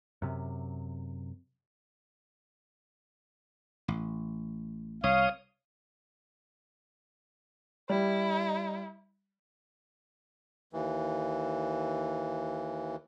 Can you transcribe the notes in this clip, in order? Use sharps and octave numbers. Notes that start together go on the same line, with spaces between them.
F#2 C3
A1
C2 C#5 F5 D#6
G3 E4
D#2 E3